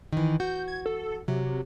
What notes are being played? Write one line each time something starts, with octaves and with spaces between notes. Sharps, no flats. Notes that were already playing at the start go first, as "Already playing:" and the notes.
D#3 E3
F#4 G6
G#6
A4
C3 F#3